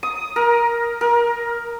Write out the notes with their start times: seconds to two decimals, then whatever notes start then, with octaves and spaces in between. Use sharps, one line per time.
0.03 D#6
0.36 A#4
1.01 A#4